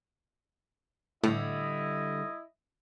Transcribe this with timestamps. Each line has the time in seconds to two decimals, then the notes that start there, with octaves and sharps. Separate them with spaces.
1.24 A2 D3 G3 E4 D#5